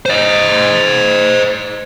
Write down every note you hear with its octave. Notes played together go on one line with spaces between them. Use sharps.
C5 D#5